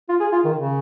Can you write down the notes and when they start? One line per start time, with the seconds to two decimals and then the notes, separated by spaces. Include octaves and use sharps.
0.09 F4
0.20 G#4
0.32 F4
0.45 D#3
0.56 C#3